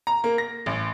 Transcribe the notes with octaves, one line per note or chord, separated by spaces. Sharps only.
A#5
A#3
A#6
A1